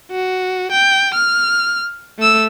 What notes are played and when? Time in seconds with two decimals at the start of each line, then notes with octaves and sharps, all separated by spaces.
0.11 F#4
0.72 G5
1.14 F6
2.19 A3 E6